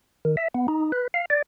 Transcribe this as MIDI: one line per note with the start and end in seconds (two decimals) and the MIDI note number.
0.25 0.36 51
0.37 0.48 76
0.54 0.67 59
0.68 0.92 63
0.92 1.08 71
1.14 1.25 77
1.30 1.42 74